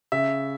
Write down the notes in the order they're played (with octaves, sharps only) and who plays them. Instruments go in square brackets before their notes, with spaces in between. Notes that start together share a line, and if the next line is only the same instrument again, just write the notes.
[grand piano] C#3 E5